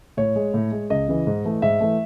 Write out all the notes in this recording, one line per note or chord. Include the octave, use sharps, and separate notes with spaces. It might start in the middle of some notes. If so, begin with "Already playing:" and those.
A2 C#5
G#3
A2
G#3
C#2 D#5
C#3 E3
G#2
E3 A3
G#2 E5
E3 A3